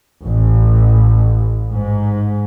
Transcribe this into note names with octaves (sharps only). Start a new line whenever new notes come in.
A1
G#2